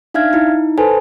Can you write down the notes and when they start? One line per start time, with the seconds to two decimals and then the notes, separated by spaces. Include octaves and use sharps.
0.14 D4 D#4 E5 F5 F6 G#6
0.33 D#4 E4
0.78 A4 B4 C5 G#5 A5